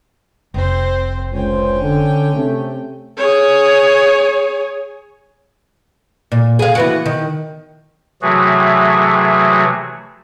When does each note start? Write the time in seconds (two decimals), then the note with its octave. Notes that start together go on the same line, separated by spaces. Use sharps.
0.54 F1 C4 C5
1.33 C#2 C#4 C5 G5
1.80 D3
2.33 C3 A3
3.18 G#4 C#5
6.32 A#2
6.59 G#4 F5
6.75 E3 B3 F#4
7.06 D#3
8.22 C3 E3 F#3 A3 F#4 G#4